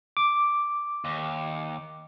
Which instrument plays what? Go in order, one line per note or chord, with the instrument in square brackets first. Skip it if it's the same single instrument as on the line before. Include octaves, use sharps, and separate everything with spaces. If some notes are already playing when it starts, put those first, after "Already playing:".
[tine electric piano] D6
[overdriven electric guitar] D#2